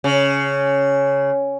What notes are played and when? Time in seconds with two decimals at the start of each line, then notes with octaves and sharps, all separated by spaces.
0.04 C#3